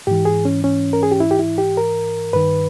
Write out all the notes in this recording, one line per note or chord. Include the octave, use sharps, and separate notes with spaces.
G#2 E3 G4
G#4
C#4
C#4
A#4
G#4
G4
E4
G4
E4
G4
A#4
G2 D#3 B4